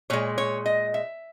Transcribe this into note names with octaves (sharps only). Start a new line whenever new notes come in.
A#2 G#3 C#5
C#5
D#5
E5